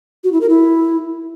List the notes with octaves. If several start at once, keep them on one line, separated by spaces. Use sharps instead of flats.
F#4
E4
A#4
E4